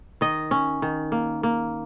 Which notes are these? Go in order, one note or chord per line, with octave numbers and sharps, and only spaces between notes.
D#3 D#5
C#4
D#3
A#3
A#3